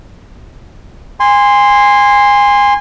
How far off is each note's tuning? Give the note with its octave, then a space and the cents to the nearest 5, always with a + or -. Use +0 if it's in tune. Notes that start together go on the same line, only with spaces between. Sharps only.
G#5 -25 C6 +0